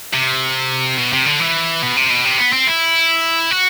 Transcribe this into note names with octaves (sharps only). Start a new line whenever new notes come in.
C3
B2
C3
D3
E3
B2
C3
B2
C3
B3
C4
E4
F#4